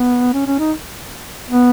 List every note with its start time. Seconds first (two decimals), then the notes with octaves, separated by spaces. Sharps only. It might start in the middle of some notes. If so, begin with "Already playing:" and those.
Already playing: B3
0.33 C#4
0.46 C#4
0.59 D#4
1.50 B3